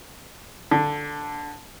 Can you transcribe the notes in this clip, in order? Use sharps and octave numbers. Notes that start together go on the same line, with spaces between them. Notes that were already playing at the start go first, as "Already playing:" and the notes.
D3